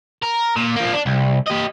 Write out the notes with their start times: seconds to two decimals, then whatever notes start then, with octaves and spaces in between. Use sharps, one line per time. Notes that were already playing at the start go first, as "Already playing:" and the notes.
0.22 A#4
0.56 A#2
0.76 F3 A#3
0.93 D4
1.06 C2
1.48 G4 D#5